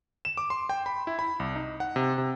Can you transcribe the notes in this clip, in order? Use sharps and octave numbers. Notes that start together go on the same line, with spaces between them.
E7
D6
C6
G5
B5
E4
B5
C2
D#4
F#5
C3
C3